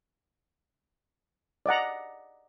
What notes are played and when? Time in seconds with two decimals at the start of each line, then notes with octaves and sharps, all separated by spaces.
1.66 D5 D#5 F#5 A#5